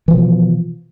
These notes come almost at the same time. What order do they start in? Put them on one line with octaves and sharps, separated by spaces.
E3 F3 B2